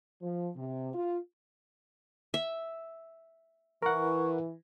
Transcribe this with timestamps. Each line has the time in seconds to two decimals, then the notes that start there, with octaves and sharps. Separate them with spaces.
0.22 F3
0.56 C3
0.94 F4
2.34 E5
3.82 E3 A#4 F#5 C#6